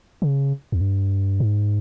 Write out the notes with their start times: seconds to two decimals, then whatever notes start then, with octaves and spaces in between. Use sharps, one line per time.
0.22 C#3
0.72 E2
0.81 G2
1.40 G#2